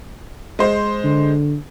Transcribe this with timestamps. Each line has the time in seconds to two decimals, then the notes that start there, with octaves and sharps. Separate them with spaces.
0.59 G#3 C5
1.04 D3